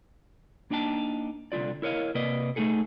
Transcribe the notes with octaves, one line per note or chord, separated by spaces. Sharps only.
A#3 D4 D#4 G5 A5
C2 D3 F4 D5
E4 A#4 C#5 D#5 F5
C3 A#3 B4 D5 D#5
A3 A#3 D#4 G#4 A4